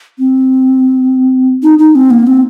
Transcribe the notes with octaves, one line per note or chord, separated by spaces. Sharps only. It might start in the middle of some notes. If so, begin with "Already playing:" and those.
C4
D#4
D#4
C4
A#3
C4